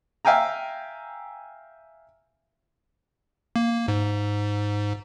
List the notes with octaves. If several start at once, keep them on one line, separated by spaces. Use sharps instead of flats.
E5 F5 G5 G#5 A#5
A#3
G#2